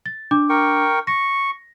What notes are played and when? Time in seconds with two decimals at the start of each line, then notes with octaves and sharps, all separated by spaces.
0.06 A6
0.31 D4 D6
0.49 A#4 G5 C#6
1.07 C#6 A#6